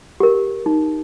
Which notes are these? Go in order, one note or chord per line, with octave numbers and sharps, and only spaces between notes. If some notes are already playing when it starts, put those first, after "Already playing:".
G4 A#4
D#4